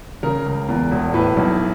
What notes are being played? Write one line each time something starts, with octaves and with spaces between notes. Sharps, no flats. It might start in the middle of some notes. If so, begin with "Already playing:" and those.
C#3 A#4
C#2
E2
E1
A2 B4
B1